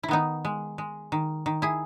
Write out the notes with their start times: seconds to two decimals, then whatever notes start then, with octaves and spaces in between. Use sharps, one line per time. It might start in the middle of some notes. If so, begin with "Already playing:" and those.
0.03 E4
0.08 D#3 B3 D#4
0.45 G#3
0.78 G#3
1.12 D#3
1.46 D#3
1.62 E4 G#4